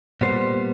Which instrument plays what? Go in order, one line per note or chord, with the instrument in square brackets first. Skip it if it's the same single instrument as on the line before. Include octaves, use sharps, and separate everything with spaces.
[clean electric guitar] A#2 G3 B3 C5